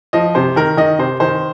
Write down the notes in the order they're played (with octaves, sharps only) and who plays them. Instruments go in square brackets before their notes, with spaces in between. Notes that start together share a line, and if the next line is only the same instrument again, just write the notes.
[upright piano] F3 D#5
C3 C5
D#3 A#4
D#3 D#5
C3 C5
D#3 C5